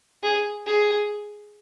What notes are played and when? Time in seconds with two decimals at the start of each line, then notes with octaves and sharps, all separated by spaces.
0.23 G#4
0.66 G#4